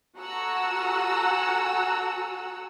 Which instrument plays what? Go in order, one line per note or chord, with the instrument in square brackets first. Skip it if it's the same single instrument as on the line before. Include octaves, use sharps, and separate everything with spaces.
[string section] F#4 A4 F#5 G#5 A#5 E6